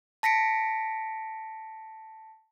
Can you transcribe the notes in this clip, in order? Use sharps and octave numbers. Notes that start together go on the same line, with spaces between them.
A5 A#6 B6 C#7 D7